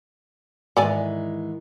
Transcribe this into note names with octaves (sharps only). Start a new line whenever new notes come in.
G#2 D#3 E3 A4 D5 G#5